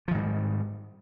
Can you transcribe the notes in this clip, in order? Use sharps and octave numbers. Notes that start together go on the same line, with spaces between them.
G#2 D#3 F3 G3